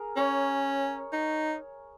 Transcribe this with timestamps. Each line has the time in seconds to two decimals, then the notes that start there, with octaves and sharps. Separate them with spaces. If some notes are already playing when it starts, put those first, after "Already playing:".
Already playing: G#4 A#4
0.17 C#4 C#5
1.12 D#4